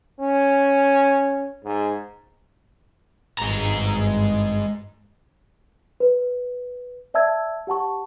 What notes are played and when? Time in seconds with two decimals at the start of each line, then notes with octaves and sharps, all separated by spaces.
0.20 C#4
1.64 G#2
3.38 G#1 G2 G#3 A#5
6.00 B4
7.14 D5 E5 A5 E6 G#6
7.67 G4 F#5 A5 C#6